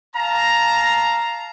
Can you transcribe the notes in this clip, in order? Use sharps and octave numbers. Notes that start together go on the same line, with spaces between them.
F5 A5 A#5